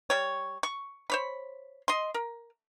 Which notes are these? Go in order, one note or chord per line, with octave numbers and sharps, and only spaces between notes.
G3 C#5
C#6
C5 C#5 B5
D#5 C6
A#4